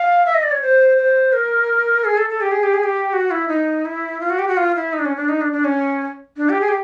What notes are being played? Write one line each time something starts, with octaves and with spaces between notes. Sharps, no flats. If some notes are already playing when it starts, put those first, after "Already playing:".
Already playing: F5
E5
D#5
D5
C#5
C5
C5
A#4
G#4
A4
A4
G4
G#4
G4
G#4
G4
F#4
E4
D#4
E4
F4
F#4
G4
F#4
F4
E4
D#4
D4
C#4
D4
D#4
D4
D4
C#4
D4
G4
G#4
G4